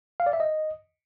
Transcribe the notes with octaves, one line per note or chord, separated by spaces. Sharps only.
F5
D5
E5
D#5